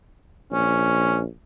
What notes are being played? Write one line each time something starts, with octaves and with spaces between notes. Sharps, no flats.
A#1 C#4